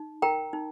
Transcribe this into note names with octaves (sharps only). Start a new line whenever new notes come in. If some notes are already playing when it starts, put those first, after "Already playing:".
Already playing: D#4
A#4 G5 A#5
D#4